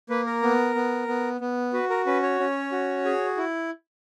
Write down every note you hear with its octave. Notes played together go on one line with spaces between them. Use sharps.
A#3 B4
A#4
B3
B3
B3
B3
F#4 B4
A#4
C#4 B4
C#5
C#4
F#4
G#4
E4